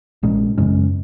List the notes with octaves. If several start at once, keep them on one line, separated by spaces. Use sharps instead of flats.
A#1 A#2 G#3 C#4
F#2 C#3 G#3 C#4